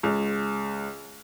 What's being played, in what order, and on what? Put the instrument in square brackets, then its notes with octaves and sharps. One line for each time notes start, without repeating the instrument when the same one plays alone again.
[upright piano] C#2